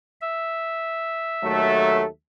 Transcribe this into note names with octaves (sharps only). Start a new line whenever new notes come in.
E5
D#2 F#3 A3